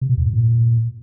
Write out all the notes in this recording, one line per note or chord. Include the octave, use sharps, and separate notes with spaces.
C3
B2
E2
G#2
A#2